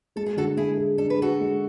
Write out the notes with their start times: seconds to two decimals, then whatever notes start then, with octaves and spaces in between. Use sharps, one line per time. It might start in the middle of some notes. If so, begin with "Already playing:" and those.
0.16 G#3 A4
0.26 G#4
0.37 D3 F#4 A4
0.57 G#3 E4 G#4
0.78 G#4
0.98 D4 A4
1.10 B4
1.19 F#4 G#4 A4
1.40 G#3